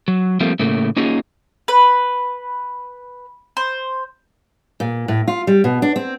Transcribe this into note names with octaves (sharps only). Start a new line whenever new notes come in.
F#3
F3 G3 A3 A#3 C4
A2 C#3 A3 A#3
A#3 C#4 D#4 F4 G#4
B4
C5
A#2
A2
F4
G3
B2
D4
C4